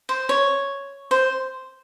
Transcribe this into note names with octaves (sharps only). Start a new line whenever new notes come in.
C5
C#5
C5